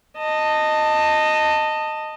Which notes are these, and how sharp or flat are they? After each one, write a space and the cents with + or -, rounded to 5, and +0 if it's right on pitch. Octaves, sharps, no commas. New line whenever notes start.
D#5 -10 A5 +15